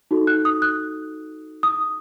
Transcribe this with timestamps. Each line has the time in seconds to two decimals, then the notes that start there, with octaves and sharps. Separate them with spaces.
0.11 D#4 F#4 A4
0.27 F#6
0.45 D#6
0.62 F#6
1.63 D#6